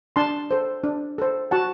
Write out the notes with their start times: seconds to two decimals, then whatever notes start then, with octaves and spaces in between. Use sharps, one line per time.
0.16 D4 A5 C6
0.51 A4 C5
0.84 D4
1.18 A4 C5
1.51 F#4 F#5 A5